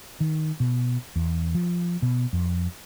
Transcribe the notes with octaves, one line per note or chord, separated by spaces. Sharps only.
D#3
B2
E2
F3
B2
F2